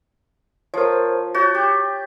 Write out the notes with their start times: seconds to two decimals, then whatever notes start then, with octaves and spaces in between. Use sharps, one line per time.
0.74 F3 A#4 C5 C#5
1.34 F#4 C#5 G6 A6
1.55 G4